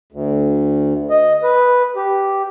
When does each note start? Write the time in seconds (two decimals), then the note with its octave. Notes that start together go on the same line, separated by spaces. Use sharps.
0.12 D2
1.10 D#5
1.43 B4
1.96 G4